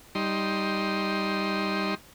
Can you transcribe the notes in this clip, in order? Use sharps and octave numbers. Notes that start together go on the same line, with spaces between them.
G3 D#4 C6